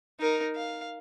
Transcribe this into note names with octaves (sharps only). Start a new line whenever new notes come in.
D#4 A#4
F5